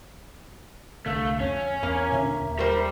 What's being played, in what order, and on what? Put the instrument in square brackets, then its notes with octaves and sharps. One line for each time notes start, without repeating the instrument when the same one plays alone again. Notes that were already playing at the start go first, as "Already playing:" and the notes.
[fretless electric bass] C2 D3 [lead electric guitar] A3 [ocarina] F5
[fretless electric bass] F2 [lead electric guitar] C#4 [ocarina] C#5
[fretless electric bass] E2 [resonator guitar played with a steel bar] A#3
[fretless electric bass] A#2 D3 D4 [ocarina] E5
[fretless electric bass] D#2
[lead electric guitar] G3 [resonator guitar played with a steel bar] A#4 C5